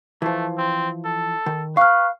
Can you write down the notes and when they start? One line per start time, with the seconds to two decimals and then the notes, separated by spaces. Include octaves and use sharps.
0.22 E3 F3 A3
0.58 C4
1.05 A4
1.46 D#3
1.77 B4 F5 C#6 F6